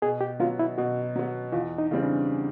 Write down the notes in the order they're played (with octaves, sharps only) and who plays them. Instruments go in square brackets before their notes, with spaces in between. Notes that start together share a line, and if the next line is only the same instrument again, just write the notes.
[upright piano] B2 [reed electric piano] G#4
[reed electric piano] G4
[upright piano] F#3 B3 [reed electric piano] F4
[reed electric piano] E4
[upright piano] B2 [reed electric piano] F#4
[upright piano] F#3 B3
[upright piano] E2 [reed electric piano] F4
[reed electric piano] D#4
[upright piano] C#3 E3 G3 C4
[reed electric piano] D4